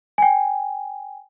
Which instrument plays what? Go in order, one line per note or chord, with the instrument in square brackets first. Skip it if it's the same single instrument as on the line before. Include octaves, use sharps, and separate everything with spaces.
[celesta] G5 G#5